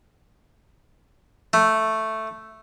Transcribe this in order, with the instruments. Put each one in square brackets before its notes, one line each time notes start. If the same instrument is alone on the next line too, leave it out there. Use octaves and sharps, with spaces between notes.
[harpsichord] A3